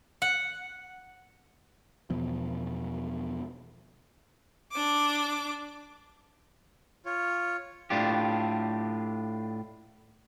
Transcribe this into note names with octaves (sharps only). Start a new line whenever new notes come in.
F#5
E2 B2 F3
D4 D6
F4 C#5
A2 D4 F4 G4